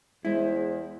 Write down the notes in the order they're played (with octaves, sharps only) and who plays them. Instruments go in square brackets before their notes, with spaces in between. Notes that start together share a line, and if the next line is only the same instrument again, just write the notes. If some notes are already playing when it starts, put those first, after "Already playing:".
[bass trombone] E2 [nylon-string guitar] G#3 [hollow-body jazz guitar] E4 [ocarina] C5